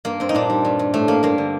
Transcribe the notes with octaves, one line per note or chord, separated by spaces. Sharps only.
G2 A#3
G2 C4
D#4
A#2 D4
G3
G2
G2
A2 A3
G3 A#3
G2 A#3
D3